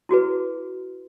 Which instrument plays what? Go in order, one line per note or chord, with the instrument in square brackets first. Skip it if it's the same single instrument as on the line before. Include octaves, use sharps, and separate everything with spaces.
[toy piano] E4 F#4 G#4 B4